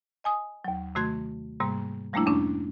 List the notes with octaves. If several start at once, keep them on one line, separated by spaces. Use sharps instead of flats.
D#5 G#5 D#6
D#2 F#3
C3 D#3 A3 F#4 C6 G#6
G#2 C3 G3 A#3
F3 G3 A3 A#3 D4 E4
F2 C3 C#4 D4